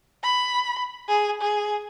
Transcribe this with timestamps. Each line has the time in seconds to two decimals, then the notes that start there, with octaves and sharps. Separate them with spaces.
0.23 B5
1.08 G#4
1.42 G#4